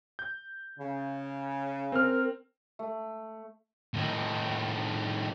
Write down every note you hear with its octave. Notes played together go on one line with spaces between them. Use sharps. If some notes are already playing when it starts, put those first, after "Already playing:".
G6
C#3
C4 A#4 F6
A3
A2 D#3